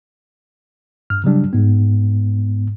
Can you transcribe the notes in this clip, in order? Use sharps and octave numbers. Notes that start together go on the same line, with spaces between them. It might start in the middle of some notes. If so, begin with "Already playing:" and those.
G2 F6
C#3 F#3 G3 D4
G#2 B3